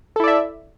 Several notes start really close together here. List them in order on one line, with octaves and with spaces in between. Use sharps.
A4 E4 D5 E5